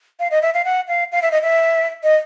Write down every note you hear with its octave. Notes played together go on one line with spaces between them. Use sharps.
F5
D#5
E5
F5
F#5
F5
F5
E5
D#5
E5
D#5